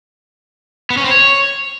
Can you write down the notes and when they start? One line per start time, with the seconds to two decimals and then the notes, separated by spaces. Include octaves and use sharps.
0.90 B3
0.97 C#4
1.04 C4
1.11 C#5